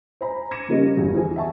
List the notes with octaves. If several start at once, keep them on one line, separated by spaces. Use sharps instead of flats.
C5 G#5 A#5 B5
D6 G#6 A#6 C#7 D#7 E7
C#3 F3 G3 A#3 C#4 D#4
G1 E2
E3 F3 G#4 G#5
E5 F#5 G#5 A5 C#6